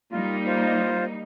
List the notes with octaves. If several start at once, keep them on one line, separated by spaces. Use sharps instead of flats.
G3 A#3 D#4 F4
F4 C5